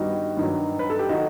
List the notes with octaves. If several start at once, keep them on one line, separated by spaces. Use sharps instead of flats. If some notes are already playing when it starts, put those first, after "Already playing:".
Already playing: G2 D#3 G3 B3 D#4 F#4
G2 D#3 F#3
B4
A4
G4
D#3 F#3 A3 D#4 F#4